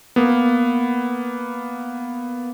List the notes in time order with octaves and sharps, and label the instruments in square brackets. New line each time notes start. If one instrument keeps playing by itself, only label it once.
[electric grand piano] A#3 B3